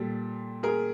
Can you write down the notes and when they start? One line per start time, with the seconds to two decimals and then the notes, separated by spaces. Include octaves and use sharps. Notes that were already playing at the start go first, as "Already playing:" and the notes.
Already playing: A#2 G3 A4
0.63 G#4 A#4